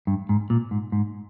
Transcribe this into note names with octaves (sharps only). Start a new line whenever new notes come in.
G2
G#2
A#2
G#2
G#2